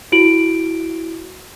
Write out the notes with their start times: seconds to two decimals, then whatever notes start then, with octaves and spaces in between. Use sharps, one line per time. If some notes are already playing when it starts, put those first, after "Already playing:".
0.12 E4 F#4 D7 F#7